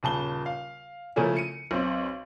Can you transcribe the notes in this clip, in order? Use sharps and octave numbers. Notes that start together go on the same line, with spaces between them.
D#1 C#3 A5 G7
F5
C#3 F3 A3 A#3 C#4 E4
C#7 D#7
B1 C4